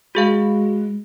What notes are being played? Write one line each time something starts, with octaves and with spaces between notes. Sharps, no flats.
G#3 F#4 G#4 F5